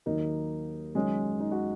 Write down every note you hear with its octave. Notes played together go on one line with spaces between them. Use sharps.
D#2 D#3 F#3 A#3 D#4
F#1 F#2 D#3 F#3 G#3 C#4
D#4
F#4